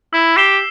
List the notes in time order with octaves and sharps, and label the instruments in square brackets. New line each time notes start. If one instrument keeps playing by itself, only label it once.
[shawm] E4 [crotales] E6
[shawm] G4 [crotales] C7 E7 G7